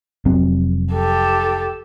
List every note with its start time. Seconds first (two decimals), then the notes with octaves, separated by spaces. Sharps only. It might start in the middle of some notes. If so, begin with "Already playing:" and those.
0.25 F1 F#3 C4
0.93 G4 A4